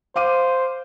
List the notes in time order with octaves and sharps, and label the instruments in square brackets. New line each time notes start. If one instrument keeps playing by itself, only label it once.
[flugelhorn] C5 [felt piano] F5 D6 D#7